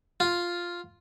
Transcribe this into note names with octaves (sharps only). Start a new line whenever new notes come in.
F4